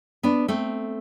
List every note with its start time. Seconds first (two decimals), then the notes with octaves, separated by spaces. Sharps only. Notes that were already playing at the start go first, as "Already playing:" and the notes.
0.23 B3 D4
0.48 A3 C4